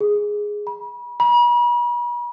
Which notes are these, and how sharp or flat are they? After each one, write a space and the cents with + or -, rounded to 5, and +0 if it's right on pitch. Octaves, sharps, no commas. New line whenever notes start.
G#4 +0
B5 -35
B5 -45